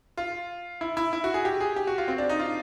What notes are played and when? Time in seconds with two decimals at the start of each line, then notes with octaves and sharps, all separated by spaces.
0.17 F4
0.81 E4
0.97 E4
1.13 E4
1.24 F#4
1.34 G#4
1.45 G4
1.61 G#4
1.76 G4
1.87 F#4
1.98 F4
2.08 C4
2.18 D4
2.29 D#4
2.39 F4